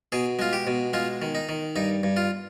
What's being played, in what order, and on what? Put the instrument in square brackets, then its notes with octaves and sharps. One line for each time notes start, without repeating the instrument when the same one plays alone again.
[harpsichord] B2 G#4
G#3 F4
G4
B2
G#3 F4
D#3
D#4
D#3
G2 D#4
G2
F4